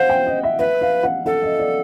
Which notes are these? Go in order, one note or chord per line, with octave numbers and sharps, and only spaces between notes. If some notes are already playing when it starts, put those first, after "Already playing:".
Already playing: C5 F5 F#5
G5
D#5
E5
B4 E5
F5
F#5
A4 F#5
D#5
D5